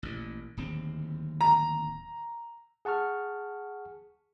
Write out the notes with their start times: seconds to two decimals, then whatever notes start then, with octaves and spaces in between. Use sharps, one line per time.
0.03 A1 A#2
0.57 D1 D#2 C4
1.41 A#5
2.85 G#4 F#5 A5 C#6 F6